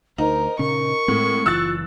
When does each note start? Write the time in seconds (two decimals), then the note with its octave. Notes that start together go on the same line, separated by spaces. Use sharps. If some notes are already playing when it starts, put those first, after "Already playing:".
0.18 D2 D#4 A#4 C5
0.59 A#2 C#3 C#4 A#4 C#6
1.08 A2 G#3 C4
1.46 F#1 E3 F4 E6 F#6 A6